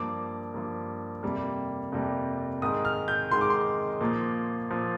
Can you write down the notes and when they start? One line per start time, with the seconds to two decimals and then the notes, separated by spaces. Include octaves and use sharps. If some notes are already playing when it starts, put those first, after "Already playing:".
Already playing: G2 F3 A#3 D6
0.53 G2 F3 A#3
1.23 F2 C3 G3 A#3
1.92 F2 C3 G3 A#3
2.62 G#2 D#3 G#3 D#6
2.85 F6
3.08 G6
3.31 G#2 D#3 G#3 C6
3.41 D6
3.50 C6
4.01 A#2 F3 A#3
4.70 A#2 F3 A#3